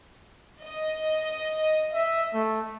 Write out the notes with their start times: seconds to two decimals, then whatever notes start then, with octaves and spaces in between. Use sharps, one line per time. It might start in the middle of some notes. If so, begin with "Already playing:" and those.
0.65 D#5
1.93 E5
2.34 A3